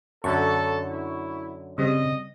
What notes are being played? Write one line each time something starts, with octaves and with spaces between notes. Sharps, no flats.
F#2 D3 A4 C#6
E4
C#3 G3 C4 D#5